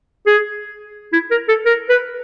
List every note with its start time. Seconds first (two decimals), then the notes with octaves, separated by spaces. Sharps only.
0.26 G#4
1.13 E4
1.31 A#4
1.48 A4
1.66 A#4
1.89 B4